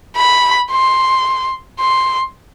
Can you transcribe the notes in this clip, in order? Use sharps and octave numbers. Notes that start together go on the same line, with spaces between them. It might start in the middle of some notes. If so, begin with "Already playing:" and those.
B5
C6
C6